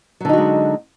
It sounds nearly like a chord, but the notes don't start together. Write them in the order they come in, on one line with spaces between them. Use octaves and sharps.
F#3 D3 D#4 F#4 G#3